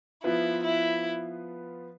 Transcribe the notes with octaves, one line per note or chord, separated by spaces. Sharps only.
F3 B3 E4 F4 B4
E4